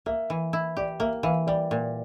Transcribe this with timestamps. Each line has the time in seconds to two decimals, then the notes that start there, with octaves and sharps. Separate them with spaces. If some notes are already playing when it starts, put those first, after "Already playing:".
0.06 A#3 E5
0.30 E3
0.53 E4
0.77 G4 D5
1.00 A#3 E5
1.23 E3 F5
1.47 G3 D5
1.71 A#2